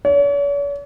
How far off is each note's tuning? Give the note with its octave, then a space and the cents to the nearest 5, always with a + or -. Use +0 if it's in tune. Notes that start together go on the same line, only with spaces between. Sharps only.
C#5 +45